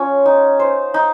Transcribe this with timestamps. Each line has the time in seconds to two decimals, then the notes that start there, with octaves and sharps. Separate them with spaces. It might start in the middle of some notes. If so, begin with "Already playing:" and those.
Already playing: C#4 F4
0.26 D#4
0.59 C5
0.94 D#4